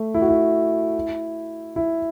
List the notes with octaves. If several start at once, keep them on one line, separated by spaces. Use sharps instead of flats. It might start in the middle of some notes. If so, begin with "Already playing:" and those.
Already playing: A3
E4
F#4
E4
E4